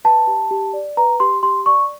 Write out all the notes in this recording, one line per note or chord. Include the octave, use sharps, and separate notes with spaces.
B4 A5
G4
G4
D5
B4 A#5
G4 C6
G4 C6
D5 C#6